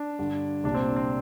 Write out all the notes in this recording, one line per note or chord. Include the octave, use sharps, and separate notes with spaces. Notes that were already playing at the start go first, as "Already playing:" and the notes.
Already playing: D4
G2 D3
C2 A#2 D4
C4
C4